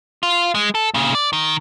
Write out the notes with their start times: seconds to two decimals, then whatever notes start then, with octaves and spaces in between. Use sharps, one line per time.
0.23 F4
0.55 G#3
0.75 A4
0.94 A#2 C#3
1.15 D5
1.33 D#3